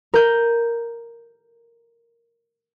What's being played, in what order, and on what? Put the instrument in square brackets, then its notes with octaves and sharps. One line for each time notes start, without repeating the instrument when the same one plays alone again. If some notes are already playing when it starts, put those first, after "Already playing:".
[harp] A#4 G6